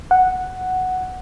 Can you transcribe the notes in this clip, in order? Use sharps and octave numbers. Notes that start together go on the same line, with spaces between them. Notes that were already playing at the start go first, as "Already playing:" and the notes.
F#5